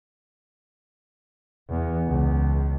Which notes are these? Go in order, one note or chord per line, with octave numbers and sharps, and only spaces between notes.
E2
C#2